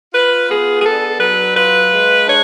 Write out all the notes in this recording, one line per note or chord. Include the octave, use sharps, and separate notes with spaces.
F4 B4
B3 G#4
G#4
D4 A4
F#3 B4
F4 B4
G#3
D4 C#5